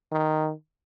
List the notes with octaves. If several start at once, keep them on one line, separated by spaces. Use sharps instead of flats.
D#3